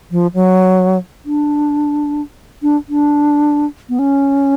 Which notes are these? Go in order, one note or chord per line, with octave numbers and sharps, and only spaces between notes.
F3
F#3
D4
D4
D4
B3
C#4